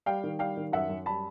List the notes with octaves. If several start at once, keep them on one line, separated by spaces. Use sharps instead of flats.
G3 F5 G5
D#3
G3 F5 G5
D#3
F#2 E5 F#5
F#2
G3 A5 B5